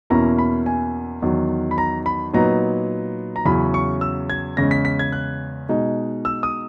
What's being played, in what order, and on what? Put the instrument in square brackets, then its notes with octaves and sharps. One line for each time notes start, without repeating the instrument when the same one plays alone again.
[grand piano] E2 B2 A#3 C#4 E4 A#5
B5
G#5
E2 D#3 F#3
B5
A#5
B5
A#2 F#3 B3 D#4 A#5
A#5
E2 C#3 F#3 C#4 E4 B5
C#6
E6
G#6
E2 C#3 G#3 C#4 A#6
B6
B6
G#6
F#6
B2 G#3 D#4
E6
D#6